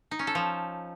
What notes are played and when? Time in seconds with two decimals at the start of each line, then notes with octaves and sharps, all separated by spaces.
0.11 D#4
0.19 C#4
0.27 A4
0.35 F3